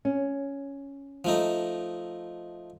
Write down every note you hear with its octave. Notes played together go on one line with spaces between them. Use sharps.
C#4
F3 A3 D#4